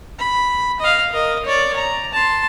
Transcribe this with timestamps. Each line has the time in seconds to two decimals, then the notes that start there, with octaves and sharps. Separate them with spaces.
0.19 B5
0.80 D#5 F5
1.12 A#4 D#5
1.45 C#5 D5
1.76 A#5
2.13 A5 C6